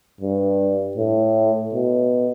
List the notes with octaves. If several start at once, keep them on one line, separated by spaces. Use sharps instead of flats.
G2
A2
B2